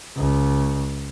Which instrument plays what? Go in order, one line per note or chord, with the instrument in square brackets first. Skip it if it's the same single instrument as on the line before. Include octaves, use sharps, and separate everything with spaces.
[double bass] C#2